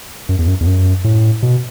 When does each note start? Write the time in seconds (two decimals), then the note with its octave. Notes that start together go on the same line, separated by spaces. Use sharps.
0.29 F#2
0.39 E2
0.48 F#2
0.60 E2
0.67 F#2
1.04 A2
1.42 B2